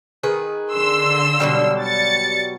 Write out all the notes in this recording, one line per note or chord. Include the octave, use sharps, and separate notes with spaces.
D#3 G#4 B4
D3 C6 E6
B2 F#3 G3
A6 C#7